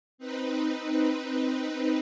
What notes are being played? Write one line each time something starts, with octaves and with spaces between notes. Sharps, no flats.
C4 D#4 B4